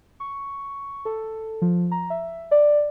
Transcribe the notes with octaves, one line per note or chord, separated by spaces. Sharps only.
C#6
A4
F3
A#5
E5
D5